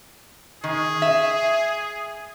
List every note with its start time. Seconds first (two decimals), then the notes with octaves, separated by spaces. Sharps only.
0.64 D#3 G#4
1.02 E5